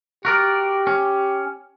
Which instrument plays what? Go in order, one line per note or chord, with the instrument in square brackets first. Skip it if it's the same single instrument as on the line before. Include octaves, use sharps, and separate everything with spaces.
[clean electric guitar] F#4 A#4 D5 [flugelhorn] G4
[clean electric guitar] C#4